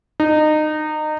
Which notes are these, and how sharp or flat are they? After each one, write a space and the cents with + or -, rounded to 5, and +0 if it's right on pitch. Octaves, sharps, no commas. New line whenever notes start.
D#4 -25